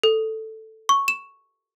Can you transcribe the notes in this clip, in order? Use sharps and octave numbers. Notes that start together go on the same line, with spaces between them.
A4
C#6
E7